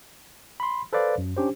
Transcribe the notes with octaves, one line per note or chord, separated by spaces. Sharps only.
B5 C6
A4 B4 C5 D5 F5
F#2
C#4 D4 G4 C5